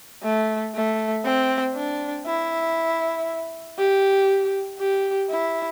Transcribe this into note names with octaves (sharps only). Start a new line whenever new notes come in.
A3
A3
C4
D4
E4
G4
G4
E4